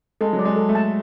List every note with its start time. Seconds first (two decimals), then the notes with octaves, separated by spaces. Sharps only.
0.21 G#3 A4
0.33 F#3
0.39 D5
0.45 G#3
0.56 A4
0.69 A3
0.75 A5